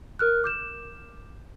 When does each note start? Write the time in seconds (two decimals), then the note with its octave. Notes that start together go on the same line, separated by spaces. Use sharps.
0.19 A#4 F6 F#6
0.44 D6 G6 E7